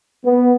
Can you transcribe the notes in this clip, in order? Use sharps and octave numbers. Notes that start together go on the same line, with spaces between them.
B3